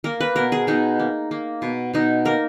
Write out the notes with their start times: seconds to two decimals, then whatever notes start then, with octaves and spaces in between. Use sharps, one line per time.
0.04 A#3 A#4
0.21 B4
0.36 B2 A#4
0.52 G#4
0.67 B2 D#4
0.99 A#3
1.31 A#3
1.62 B2
1.94 B2 D#4
2.25 A#3 A#4